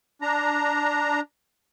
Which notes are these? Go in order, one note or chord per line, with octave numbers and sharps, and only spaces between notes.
D4 A#5